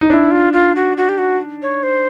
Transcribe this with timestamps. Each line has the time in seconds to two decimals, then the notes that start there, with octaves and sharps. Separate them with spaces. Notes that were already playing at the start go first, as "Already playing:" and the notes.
0.01 D#4
0.10 D4 E4
0.31 F4
0.53 F4
0.76 F#4
0.97 F#4
1.09 G4
1.18 F#4
1.62 C#5
1.83 C5